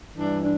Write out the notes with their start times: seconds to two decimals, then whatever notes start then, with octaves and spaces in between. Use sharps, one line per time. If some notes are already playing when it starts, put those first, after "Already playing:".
0.14 G2 E3 D4
0.43 D4